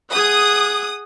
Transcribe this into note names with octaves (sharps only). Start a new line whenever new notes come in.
G#4 F#5 D#6